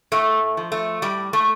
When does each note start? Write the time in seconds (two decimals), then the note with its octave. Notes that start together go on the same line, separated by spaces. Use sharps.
0.12 A2 A3
0.57 F3
0.72 A3
1.02 A2 G3
1.33 A3